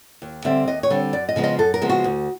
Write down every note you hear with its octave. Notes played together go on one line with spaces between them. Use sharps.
D#2
D3 G3 C4 E5
D#2 D#5
C#5
D3 G3 C4
F#2 D5
D#5
C#3 F3 G#3 B3
D#5
F#2 A4
A#4
C#3 F3 G#3 B3
F#4
D2